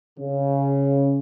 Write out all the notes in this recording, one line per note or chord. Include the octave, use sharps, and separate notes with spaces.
C#3